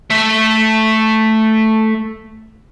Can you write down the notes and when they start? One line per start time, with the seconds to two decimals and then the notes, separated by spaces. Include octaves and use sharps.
0.11 A3 E5